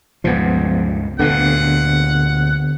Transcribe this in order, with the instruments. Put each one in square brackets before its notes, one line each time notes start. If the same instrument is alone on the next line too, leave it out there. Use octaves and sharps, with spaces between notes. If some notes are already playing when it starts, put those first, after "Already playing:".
[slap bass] C#2 G2 A#2 [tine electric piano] F3 B3
[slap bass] D2 A#2 [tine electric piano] D3 B3 [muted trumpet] F#5